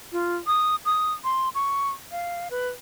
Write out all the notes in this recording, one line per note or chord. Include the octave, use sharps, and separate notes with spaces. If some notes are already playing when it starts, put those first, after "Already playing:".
F4
D#6
D#6
C6
C#6
F5
B4